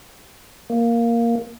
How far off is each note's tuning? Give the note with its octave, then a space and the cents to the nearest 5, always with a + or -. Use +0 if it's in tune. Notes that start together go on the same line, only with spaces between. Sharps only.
A#3 +0